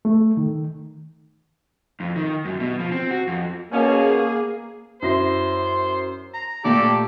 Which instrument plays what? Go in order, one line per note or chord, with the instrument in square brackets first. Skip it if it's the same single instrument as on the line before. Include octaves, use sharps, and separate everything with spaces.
[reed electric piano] A3
D#3
[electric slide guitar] F2
D#3
F#2
B2
F3
C4
F#4
F2
[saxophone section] B2 C#4 [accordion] A#3 [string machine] G#4
[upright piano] F#2 E4 A#6 [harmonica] C5
[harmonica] A#5
[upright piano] A#2 A3 [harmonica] G4 A4 D5